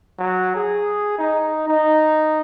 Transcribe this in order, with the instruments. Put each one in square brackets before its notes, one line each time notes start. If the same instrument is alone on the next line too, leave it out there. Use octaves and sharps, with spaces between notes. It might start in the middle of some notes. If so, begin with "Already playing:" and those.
[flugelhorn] F#3
G#4
D#4
D#4